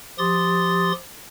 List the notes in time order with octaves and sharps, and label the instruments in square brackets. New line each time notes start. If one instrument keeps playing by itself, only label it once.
[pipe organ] F3 G4 C6 D#6 A6